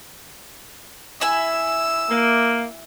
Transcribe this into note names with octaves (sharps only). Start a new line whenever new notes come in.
E4 E5 G#5 E6
A#3